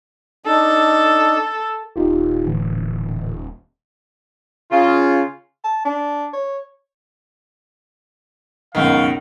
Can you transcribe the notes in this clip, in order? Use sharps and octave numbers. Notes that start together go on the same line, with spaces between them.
D4 D#4 A4
D#1 D#4 F4 G4
A2 D3 E3
C#3 F4
A5
D4
C#5
C#2 F#2 B2 D#3 F5